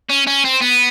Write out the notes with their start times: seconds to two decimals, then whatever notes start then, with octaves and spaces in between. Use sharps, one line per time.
0.09 C#4
0.27 C#4
0.45 C4
0.61 B3